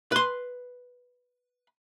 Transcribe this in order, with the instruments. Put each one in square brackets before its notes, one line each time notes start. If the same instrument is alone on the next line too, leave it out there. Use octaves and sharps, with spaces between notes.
[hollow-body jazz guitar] B4 C6